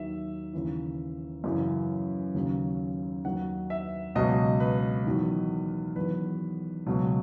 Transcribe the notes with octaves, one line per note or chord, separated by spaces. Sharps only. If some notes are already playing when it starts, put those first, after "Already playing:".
Already playing: D#2 D#3 F#3 E5
D#2 C#3 E3
F#2 C#3 E3
D#2 C#3 F#3
D#2 D#3 F#3 F#5
E5
C#2 B2 F#3 D#5
B4
E2 D#3 F#3
E2 D#3 F#3 B4
C#2 B2 F#3